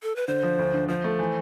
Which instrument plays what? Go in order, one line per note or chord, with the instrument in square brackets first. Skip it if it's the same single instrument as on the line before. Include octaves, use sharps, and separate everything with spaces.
[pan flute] A4
B4
[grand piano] D3 [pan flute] C5
[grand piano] F3
D2
D3
[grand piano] F3 [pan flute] C5
[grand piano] A3
E3